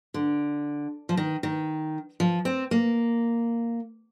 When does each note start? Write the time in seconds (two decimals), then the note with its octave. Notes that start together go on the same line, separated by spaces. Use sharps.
0.14 D3
1.09 F3
1.17 D#3
1.43 D#3
2.20 F3
2.45 C4
2.71 A#3